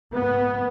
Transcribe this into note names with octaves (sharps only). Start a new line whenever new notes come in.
G#2 B3